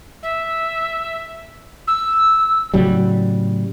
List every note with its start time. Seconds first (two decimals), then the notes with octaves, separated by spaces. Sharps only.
0.23 E5
1.87 E6
2.74 A2 C#3 F#3 G3